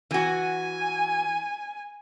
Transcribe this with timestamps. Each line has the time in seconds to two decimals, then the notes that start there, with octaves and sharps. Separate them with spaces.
0.11 E3 F#4 G#5